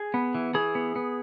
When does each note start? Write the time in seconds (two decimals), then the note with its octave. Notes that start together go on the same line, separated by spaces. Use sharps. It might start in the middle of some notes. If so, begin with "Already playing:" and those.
Already playing: G#4
0.14 B3
0.35 E3
0.54 E3 G#4
0.75 B3
0.96 B3